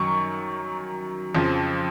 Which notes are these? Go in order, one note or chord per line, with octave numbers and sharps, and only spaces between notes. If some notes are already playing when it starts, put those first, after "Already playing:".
Already playing: F#2 D#3 F#3 C#6
F2 C#3 F3